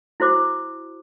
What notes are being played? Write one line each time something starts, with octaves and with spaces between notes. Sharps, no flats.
E4 F#4 C5 D6